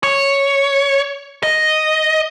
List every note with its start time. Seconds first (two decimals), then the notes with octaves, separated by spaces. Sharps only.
0.03 C#5
1.43 D#5